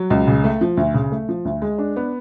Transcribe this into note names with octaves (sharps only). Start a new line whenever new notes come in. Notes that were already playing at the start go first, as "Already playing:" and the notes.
Already playing: F#3
C#2
C#3
A3
F3
D2
C#3
A3
F3
D2
G#3
D4
B3